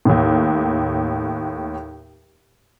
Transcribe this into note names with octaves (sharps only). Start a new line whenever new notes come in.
D#2 A2